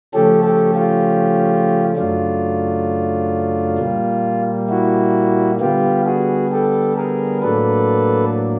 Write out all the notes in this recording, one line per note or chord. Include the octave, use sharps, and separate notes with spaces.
C#3 F3 A3 C#4 G4 A4
G4 A4
F4 G4
F#2 C#3 F#3 A3 D4 F4
A#2 G3 A#3
E4 F#4
D3 G3 B3 F4 G4
F#4 G#4
G4 A4
G#4 A#4
A2 F#3 A#3 D4 A4 B4